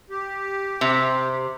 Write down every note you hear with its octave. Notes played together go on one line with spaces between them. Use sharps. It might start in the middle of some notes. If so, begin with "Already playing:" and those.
G4
C3